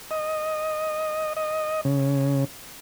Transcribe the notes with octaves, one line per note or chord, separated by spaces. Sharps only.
D#5
D#5
C#3